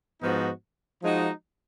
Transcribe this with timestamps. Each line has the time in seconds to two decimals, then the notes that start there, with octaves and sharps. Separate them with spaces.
0.22 G#2 F3 B3 D#4 F#4
1.01 F3 G#3 D#4 F#4